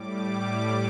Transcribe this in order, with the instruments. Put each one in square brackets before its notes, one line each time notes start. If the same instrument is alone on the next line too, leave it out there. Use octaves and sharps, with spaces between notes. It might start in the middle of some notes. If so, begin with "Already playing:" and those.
Already playing: [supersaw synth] A2 G3 D6